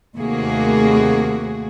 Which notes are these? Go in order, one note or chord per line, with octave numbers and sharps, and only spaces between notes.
D#2 C3 A3 A#3 F#4 G#4